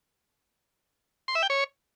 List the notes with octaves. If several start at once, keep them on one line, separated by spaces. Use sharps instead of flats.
C6
E5
G5
C#5